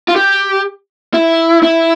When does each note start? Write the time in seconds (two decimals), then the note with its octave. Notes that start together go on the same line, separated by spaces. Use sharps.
0.08 F4
0.16 G4
1.14 E4
1.63 E4